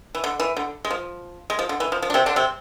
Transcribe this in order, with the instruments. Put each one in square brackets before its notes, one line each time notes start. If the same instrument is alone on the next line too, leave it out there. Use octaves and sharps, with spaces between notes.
[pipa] E3
D3
E3
D3
G#3
F3
G#3
F3
D3
E3
F3
F3
D4
C3 C4
D3 D4
C3 C4